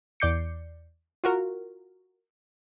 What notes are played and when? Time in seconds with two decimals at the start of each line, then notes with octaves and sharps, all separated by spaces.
0.20 E2 D5 D6 G6 C7 C#7
1.24 F4 F#4 A#4